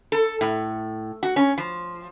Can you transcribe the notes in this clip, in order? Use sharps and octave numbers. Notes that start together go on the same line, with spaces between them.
A4
A2
F#4
C#4
F3